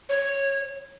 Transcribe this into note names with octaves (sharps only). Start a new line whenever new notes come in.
C#5